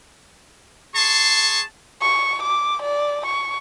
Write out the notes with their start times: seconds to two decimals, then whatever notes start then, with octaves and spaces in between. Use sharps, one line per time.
0.94 G#4 A5 C6 C#6
2.02 C#6
2.43 D6
2.83 D5
3.27 C#6